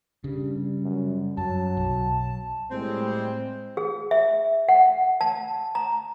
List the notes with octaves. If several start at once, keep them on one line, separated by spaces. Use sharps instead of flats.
G2 C#3 G3
F#2
F#2 F#3 A5
B1
A2 G3 G#3 C4
G#4
E5
F#5
A5
A#5